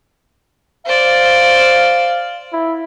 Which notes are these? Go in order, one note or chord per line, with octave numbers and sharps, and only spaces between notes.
C5 D5 F5
E4